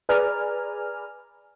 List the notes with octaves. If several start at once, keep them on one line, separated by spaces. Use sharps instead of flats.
G#4 B4 D5 G#5 A#5 F6